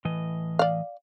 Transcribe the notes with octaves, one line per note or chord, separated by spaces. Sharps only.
A2 E3 D#5
D5 F5